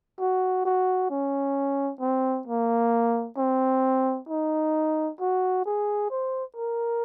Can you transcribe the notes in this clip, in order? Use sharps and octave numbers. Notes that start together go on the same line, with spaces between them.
F#4
F#4
C#4
C4
A#3
C4
D#4
F#4
G#4
C5
A#4